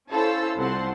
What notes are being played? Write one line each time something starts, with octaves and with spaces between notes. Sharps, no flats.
C#4 E4 A4 C5 F5 E6
C2 C4 F4 F#5 A5 C6